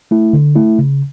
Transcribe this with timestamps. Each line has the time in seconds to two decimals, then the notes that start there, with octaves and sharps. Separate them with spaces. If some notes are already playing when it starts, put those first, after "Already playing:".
0.11 A3 E4
0.33 D3
0.56 A3 E4
0.79 C#3